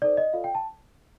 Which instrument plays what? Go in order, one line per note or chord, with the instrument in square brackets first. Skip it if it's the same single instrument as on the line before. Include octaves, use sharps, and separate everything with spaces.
[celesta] D#4 A4 C5 D5
D#5
F4 A4 D5 F5
G5
A5